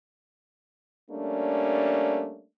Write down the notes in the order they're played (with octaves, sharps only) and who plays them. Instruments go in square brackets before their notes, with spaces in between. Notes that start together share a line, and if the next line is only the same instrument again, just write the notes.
[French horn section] G3 A3 A#3 C#4 D4